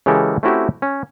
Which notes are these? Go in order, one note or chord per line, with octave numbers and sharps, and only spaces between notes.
C#3 E3 G#3 G4 A4 A#4
A3 C4 C#4 E4 F#4 G4
C#4